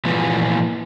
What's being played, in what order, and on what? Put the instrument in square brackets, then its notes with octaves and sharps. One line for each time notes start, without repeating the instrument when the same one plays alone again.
[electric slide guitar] A#2 E3 F3 A3 B3